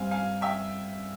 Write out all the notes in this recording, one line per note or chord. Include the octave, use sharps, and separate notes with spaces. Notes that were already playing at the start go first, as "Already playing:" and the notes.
Already playing: G2 G3 C4 F5 G#5
F5 G#5
E5 G5